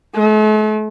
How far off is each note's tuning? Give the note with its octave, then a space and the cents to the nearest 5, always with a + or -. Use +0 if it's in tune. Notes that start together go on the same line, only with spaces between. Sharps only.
A3 -45